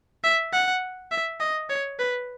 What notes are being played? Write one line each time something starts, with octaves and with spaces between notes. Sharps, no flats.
E5
F#5
E5
D#5
C#5
B4